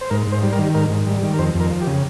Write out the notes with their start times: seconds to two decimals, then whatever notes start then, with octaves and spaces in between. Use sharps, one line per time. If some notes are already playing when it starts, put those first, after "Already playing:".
0.01 C5
0.10 G#2 A#4
0.27 G#2
0.32 C5
0.43 G3
0.53 A#4
0.58 D#3
0.75 G#2 A#4
0.90 G#2
1.07 G3
1.23 D#3
1.34 A#4
1.38 F2 C5
1.54 F2
1.60 A#4
1.71 F3
1.81 G4
1.87 C#3